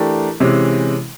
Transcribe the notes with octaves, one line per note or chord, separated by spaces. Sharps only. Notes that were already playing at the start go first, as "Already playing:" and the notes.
Already playing: E3 A3 D4 G4 A#4
C3 E3 G#3 C#4